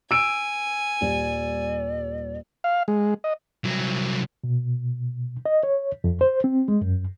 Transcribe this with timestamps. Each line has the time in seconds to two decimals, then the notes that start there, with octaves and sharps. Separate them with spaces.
0.11 G#5 E6 D7
1.01 D#1 G3 D5
2.64 F5
2.88 G#3
3.24 D#5
3.65 C2 F#3
4.44 B2
5.46 D#5
5.63 C#5
6.04 F2
6.21 C5
6.44 C4
6.68 G#3
6.81 F#2